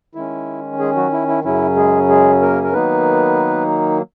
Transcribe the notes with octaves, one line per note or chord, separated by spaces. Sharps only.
D#3 G#3 C#4 E4
G#3 G#4
F#3 F#4
E4
E4
F#2 C#3 F#3 C#4 E4
G#3 G#4
G#3 G#4
A#3 A#4
A#4
D#3 F#3 A#3 B3 D#4 B4